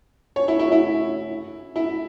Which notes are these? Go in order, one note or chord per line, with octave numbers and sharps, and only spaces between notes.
C#5
E4
E4
E4
E4